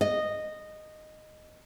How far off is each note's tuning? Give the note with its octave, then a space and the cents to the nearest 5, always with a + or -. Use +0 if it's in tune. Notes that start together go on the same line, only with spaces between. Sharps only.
D#5 -10